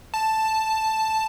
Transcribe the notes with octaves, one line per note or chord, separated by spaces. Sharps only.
A5